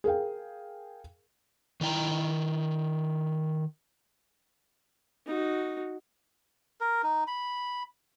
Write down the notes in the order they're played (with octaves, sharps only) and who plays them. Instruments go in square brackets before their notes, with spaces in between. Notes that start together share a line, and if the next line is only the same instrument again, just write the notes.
[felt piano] G#4 A#4 F5 G5
[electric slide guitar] D#3 E4 G5 A#5
[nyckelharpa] D#4 F#4
[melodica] A#4
D#4
B5